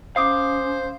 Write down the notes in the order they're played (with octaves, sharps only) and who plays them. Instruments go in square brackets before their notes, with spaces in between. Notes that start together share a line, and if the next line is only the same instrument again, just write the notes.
[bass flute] C#4 [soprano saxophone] C5 [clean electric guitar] F5 [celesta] D6 D#6 C7